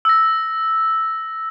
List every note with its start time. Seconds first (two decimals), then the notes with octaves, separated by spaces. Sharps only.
0.05 E6 A#6